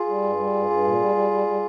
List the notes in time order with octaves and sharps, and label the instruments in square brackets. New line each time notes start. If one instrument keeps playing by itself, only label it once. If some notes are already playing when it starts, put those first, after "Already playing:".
Already playing: [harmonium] F4 G#4
G3
G2
G3
G2
G2
A#2
G3
G3
G3
G3